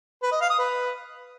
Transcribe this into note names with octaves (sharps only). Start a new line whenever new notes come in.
B4
D#5
F5
D#6
B4